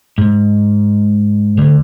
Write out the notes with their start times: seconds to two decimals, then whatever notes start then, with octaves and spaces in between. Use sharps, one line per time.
0.18 G#2
1.58 D2